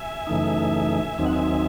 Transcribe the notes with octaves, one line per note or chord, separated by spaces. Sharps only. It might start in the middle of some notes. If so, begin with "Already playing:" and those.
Already playing: E5 G#5
F#2 C#3 E3 A3 D#4
D#2 D#3 F#3 C4 D#4 G#5
F#5
E5 G#5